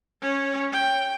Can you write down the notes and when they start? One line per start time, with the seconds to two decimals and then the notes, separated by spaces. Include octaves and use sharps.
0.22 C#4 C#5
0.72 G5